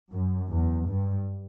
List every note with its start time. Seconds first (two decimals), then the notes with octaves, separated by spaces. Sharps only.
0.12 F#2
0.51 E2
0.89 G2